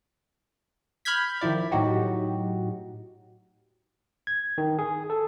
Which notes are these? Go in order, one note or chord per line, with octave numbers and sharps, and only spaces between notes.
B5 F6 G6 G#6 B6
D#3 F3 E4 D5
A2 F#3 D#4 F#4 G4
G#6
D#3
G#4
A4